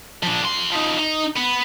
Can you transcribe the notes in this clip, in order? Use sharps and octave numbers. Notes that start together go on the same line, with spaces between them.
F3 D4
F2 C6
F3 D#4
D#4
B3